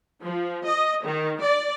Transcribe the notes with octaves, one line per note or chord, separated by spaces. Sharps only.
F3
D#5
D#3
D5